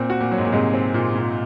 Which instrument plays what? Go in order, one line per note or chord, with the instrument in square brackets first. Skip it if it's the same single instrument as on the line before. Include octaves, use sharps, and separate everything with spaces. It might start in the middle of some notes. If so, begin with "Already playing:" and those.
Already playing: [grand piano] A#2 [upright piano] C4
[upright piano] F#4
[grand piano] A#2
[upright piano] F#3
[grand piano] G#2
A#2
[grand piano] G#2 C3 [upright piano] G#3
[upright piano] C4
A#2
A#2